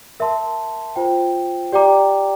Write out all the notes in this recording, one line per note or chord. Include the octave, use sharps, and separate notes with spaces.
A#4 E5 A5 C6
F4 C5 G5
G4 D5 G5 A#5 D6